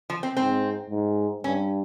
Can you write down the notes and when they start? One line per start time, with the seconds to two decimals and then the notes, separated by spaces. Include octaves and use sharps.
0.10 F3
0.23 C4
0.37 G#2 C4
0.90 G#2
1.44 G2 C#4